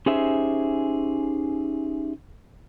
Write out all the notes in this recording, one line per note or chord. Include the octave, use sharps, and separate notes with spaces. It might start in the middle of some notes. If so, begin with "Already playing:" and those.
C#4 D#4 G4 G#4 C5 E5